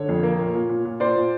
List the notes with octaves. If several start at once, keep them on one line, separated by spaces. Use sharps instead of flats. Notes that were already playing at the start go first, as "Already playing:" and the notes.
Already playing: D3 C#5
F2
A#3
A#2
A#2
A#2
A#2
A#2 C5 D5
A#2